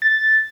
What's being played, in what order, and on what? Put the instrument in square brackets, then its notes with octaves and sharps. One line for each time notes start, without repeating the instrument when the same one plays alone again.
[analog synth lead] A6